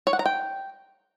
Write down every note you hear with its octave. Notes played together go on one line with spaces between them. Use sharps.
C#5
F#5
A#5
G5